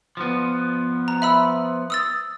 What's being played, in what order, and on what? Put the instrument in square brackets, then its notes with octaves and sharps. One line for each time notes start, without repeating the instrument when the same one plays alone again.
[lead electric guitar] F3 B3
[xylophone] A#5
E5 B5 E6
D#6 E6 A6